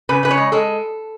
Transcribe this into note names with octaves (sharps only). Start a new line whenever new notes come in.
C#3 B4
C#3 B4
C#5
G#3
G#3 A4